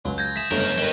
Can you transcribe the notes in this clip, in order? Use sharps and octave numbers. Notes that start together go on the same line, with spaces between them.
C#2 F#3
G6 G#6 A#6
G#4 E5 B6 E7
G1 F#2 C#3 G#3 A3 A#4
E7
D#3 G3 C4 B4